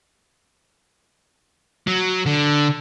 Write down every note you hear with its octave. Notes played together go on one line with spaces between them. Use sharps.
F#3
D3